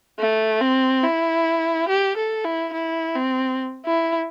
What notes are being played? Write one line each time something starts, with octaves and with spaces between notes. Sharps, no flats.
A3
C4
E4
G4
A4
E4
E4
C4
E4